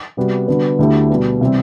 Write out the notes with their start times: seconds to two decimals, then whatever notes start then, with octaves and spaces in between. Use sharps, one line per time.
0.17 C3 G3 B3 F#4
0.48 D3 G3 B3 F#4
0.79 D2 D3 A3 E4 G4
1.10 B2 G3 B3
1.41 C3 E3 G3 C4